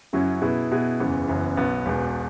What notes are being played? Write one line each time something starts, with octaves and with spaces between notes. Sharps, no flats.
F#2 C#3 F#3 C#4 E4
B2 B3 E4 G#4
B2 B3 E4 G#4
F#1 E2 C#3 E3 B3
F#1 F#2 E3 B3
B1 B2 B3
E1 E2 B2